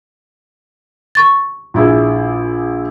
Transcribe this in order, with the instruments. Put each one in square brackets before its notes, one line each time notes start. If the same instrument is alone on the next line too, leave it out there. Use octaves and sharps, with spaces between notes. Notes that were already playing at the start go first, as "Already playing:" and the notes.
[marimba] C#6 A6
[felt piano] A#1 E4 G#4